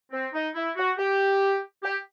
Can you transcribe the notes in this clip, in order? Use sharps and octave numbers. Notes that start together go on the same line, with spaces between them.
C4
D#4
E4
F#4
G4
G4